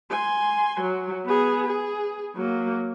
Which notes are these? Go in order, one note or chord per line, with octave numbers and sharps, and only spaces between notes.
G#5 C6
F#3
B3 G#4
G#4
F#3 A#3